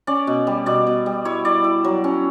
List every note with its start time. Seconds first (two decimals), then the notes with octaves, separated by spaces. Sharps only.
0.07 C#4 D5
0.27 B2
0.47 G3
0.66 B2 D5
0.87 B2
1.06 G3
1.25 E4 C#5
1.45 E4 D5
1.64 E4
1.84 F#3
2.04 C#4